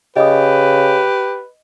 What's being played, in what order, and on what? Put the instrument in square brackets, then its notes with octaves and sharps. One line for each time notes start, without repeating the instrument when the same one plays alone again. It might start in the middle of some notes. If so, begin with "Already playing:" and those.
[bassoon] C#3 [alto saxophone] G4 [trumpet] B4 [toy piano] D#5 D#6